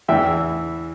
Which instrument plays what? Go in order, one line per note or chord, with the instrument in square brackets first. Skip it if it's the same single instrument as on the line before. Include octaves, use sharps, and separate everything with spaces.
[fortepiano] E2 E3 E5 G5